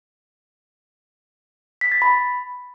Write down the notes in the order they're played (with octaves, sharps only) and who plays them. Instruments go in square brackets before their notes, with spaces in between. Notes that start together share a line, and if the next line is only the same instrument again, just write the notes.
[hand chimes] B6
A6
B5